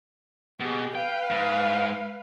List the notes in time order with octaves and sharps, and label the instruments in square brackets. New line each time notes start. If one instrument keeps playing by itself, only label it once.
[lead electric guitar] B2 [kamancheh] G4 G#4
[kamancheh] B4 F5 [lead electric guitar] G5
[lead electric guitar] G#2